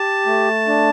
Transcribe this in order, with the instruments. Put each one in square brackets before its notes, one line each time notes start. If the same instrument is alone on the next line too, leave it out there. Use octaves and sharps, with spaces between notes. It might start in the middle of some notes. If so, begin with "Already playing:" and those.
Already playing: [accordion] G4 [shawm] A5
[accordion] A3
D4